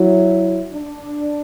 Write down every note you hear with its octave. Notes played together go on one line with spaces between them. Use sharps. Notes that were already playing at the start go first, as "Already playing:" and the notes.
Already playing: F#3 E4
D4